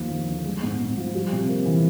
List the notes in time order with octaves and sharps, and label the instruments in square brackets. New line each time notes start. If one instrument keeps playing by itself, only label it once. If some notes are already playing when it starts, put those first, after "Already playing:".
Already playing: [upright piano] D#2 F3
D#2
D3
G#3
G#2
G#2
F3
G3
C3
A#3
E3